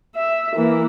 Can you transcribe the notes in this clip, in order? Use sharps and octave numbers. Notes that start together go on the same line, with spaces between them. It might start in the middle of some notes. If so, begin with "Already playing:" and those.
E5
E3 A#3